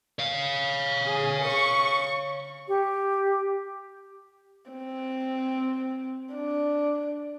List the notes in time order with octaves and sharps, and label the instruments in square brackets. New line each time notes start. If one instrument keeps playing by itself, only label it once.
[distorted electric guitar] C#5 F5
[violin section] G#4
C#6
[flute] G4
[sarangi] C4
D4